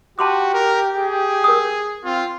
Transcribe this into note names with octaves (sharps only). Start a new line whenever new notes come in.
F#4 G4 A5 C6 D6
A#4
G#4
A#4 D#6
C4 F4